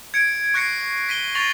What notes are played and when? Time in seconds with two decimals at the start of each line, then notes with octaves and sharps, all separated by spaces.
0.14 G#6 C#7 D7
0.54 C#6 F#6 G#6 A#6 C7 C#7
1.09 B6 D#7 G7
1.35 C#6 A6 A#6 C7 F7 F#7